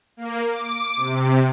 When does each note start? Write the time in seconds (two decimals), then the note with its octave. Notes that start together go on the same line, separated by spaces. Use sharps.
0.17 A#3
0.48 D6
0.97 C3